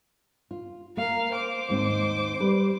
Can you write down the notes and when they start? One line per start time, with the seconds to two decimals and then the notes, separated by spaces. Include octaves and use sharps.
0.51 F4
0.97 A#3 A#4 F5
1.32 C5 D6
1.69 D#2 G#2 C4
2.40 G3 B4